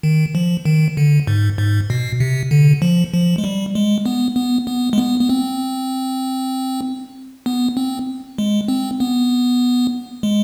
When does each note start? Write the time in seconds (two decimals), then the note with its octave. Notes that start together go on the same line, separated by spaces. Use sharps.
0.03 D#3
0.35 F3
0.65 D#3
0.97 D3
1.27 G#2
1.58 G#2
1.90 B2
2.20 C3
2.51 D3
2.82 F3
3.14 F3
3.38 G#3
3.44 G3
3.75 G#3
4.06 B3
4.36 B3
4.67 B3
4.93 G#3
4.98 B3
5.20 B3
5.29 C4
7.46 B3
7.77 C4
8.38 G#3
8.68 C4
9.00 B3
10.23 G#3